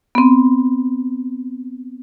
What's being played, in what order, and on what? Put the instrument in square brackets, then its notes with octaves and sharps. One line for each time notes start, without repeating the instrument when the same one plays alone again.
[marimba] B3 C4